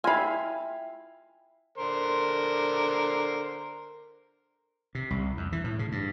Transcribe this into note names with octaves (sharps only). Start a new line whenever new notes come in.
E4 F4 E5 F5 G5 G#5 B5
D3 A#4 C5
C3
C2
F2
E3
A2
C#3
G2